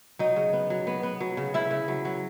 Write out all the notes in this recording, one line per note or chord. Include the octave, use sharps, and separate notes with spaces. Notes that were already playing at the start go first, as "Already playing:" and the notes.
F#3 D#4 D#5
C#3
B3
F#3
B3
B3
F#3
C#3
C#3 E4 E5
C#3
F#3
F#3